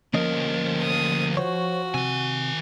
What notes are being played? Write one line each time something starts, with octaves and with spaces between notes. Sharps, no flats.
D2 F3 A#3 C#4 A#4 D#5
D#6
F#4 C5 C#5
C3 D#3 G#5